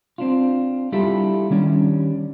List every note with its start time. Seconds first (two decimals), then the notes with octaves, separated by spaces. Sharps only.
0.18 C4 D4 F4
0.92 G3 D4 E4 F4 G4 A4
1.50 D#3 G3 C#4 D4